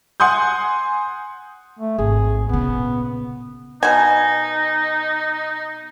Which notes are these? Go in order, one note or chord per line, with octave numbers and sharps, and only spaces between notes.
F#5 G#5 C6 D#6 G6
A3
G#1 G#4
A#2 C#3 B3
B2 D#4 G#5